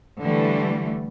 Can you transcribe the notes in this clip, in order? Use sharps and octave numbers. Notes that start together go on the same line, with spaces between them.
D3 E3 G3 A3